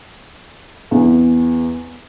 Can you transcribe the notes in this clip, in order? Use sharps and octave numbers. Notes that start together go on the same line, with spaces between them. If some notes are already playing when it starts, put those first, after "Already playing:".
E2